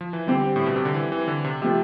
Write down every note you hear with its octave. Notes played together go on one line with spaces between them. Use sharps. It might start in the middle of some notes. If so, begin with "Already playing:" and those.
F3
E3
D3 G3 C4 G4
A2
B2
C3
D3
E3
E3
D3
C3
C3 F3 A3 C4 G4